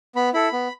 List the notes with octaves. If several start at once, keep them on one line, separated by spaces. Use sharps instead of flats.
B3 B5
E4 A4 B5
B3